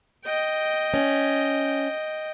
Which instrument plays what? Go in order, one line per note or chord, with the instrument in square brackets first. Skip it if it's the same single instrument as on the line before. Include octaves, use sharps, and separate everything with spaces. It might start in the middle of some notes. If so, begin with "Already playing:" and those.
[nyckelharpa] D#5 G5
[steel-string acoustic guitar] C#4